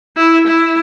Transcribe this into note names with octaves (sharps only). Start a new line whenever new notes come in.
E4
E4